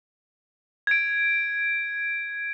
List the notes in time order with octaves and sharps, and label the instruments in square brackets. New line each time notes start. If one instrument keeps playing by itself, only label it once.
[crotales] G#6 D7